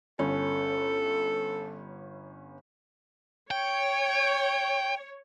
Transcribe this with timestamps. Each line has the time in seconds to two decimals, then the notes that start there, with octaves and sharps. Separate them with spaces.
0.19 G1 C#4 A4
3.51 C#5 G5